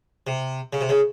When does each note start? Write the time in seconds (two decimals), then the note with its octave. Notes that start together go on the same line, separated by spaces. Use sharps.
0.27 C3
0.73 C#3
0.81 C3
0.89 C#3